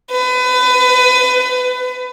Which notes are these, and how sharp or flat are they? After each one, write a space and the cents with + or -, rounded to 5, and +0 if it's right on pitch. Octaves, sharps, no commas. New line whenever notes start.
B4 +30